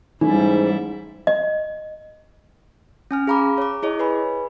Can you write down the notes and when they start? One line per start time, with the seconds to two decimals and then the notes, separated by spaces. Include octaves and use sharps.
0.21 G#2 E3 G3 A3 C#4 D#4 E4
1.27 D#5
3.11 C#4 G#5 F6
3.27 G#4 F5 A#5 B5 D6
3.58 C#5 D6
3.82 E4 G#4 C#5 D#5
3.99 B4 G#5 B5